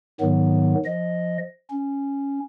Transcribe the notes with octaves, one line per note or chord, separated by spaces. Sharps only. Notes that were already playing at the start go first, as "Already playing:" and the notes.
G#2 D#3 F#3 B3
F3 D#5
C#4